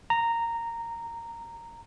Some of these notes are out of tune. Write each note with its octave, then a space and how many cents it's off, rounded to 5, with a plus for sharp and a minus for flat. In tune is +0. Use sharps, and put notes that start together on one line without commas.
A#5 -10